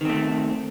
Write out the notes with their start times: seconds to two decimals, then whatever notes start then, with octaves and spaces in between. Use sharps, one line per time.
0.01 D#3
0.05 C4
0.09 A3